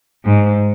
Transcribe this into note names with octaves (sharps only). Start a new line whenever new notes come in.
G#2